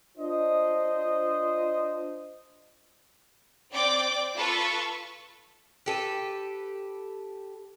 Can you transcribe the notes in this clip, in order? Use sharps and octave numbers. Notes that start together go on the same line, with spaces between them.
D4 F4 C5 D#5
C4 D5 G5 D6
F4 A4 B4 A5 C#6
G4 A4 B4